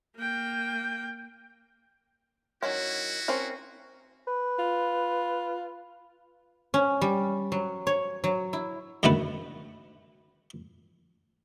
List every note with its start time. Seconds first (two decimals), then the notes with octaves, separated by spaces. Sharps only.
0.17 A#3 G5
2.63 D#3 F#3 C#4 E4 F#4
3.28 C4 C#4 A#4
4.27 B4
4.59 F4
6.74 C#4
7.01 G3
7.52 F#3
7.87 C#5
8.24 F#3
8.53 E4
9.03 F#2 D3 D#3 A3 B3 B4